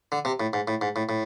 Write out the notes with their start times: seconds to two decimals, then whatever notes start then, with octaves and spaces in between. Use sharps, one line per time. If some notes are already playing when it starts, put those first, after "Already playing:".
0.12 D3
0.25 C3
0.40 A2
0.53 G#2
0.68 A2
0.81 G#2
0.96 A2
1.09 A2